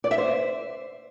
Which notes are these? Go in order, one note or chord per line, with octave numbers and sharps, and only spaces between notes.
D5
E5
C5